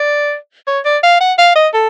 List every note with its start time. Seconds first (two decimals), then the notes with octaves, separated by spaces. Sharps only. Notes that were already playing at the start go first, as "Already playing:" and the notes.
Already playing: D5
0.67 C#5
0.85 D5
1.03 F5
1.21 F#5
1.38 F5
1.55 D#5
1.74 A4